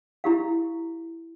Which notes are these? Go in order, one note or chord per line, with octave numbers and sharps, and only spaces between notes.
E4 G4 F5